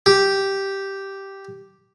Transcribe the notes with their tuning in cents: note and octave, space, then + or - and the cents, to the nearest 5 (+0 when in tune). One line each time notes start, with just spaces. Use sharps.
G4 -5